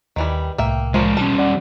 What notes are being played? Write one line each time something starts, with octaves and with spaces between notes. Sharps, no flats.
D#2 D#3 E3 G3
C2 A2 A#3 E5 G5
F3 G#3 A#3 C#4 D5
B2 G3 C#4 D4 A5
D5 F#5 D6